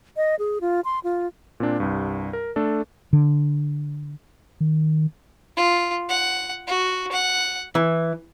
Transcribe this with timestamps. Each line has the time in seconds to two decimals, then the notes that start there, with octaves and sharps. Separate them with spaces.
0.17 D#5
0.39 G#4
0.61 F4
0.85 C6
1.04 F4
1.60 A#2 C4 D4
1.80 C2 G2
2.33 A#4
2.56 A3 D4 A4
3.13 D3
4.61 D#3
5.57 F4
6.09 F#5
6.67 F#4
7.12 F#5
7.75 E3